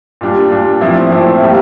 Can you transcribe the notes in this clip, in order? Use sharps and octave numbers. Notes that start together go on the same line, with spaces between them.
A#2 G3 D4
A#2 G3 D4
A#2 F3 A3 C4 E4
A#2 F3 A3 C4 E4
A2 G3 A#3